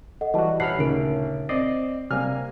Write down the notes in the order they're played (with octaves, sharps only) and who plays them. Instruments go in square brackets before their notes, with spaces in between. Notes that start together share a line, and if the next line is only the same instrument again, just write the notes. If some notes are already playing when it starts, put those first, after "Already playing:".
[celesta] A4 D#5 F#5
[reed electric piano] E3 G3 F#4 [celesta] D#5 A5
[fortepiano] A1 [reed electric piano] F#5 B5 F6 [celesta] C7
[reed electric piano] D2 A#2 C#3 [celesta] D#4 A#4 D7
[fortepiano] C4 [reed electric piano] D5 D#5 [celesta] C7
[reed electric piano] C3 G3 [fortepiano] A#3 G#5 F6